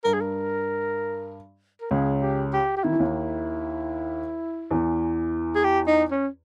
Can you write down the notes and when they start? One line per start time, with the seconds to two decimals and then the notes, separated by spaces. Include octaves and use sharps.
0.04 G2 A#4
0.14 G#4
0.21 A#4
1.81 A#4
1.91 C#2 C#3 G#4
2.22 G4
2.53 G4
2.76 G4
2.84 D#3 E4
2.93 E3
3.00 D#2 D#3
4.71 E2 E3
5.55 G#4
5.64 G4
5.87 D#4
6.11 C#4